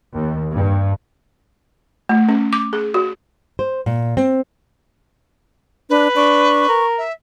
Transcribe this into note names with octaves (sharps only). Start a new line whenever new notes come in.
D#2
G2
A3
C#4
D6
G#4
F#4
C5
A#2
C4
D4 B4
D4 C#6
A#4
E5